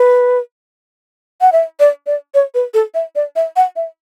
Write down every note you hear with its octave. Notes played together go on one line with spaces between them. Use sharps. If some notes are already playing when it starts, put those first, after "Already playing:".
Already playing: B4
F#5
E5
D5
D5
C#5
B4
A4
E5
D5
E5
F#5
E5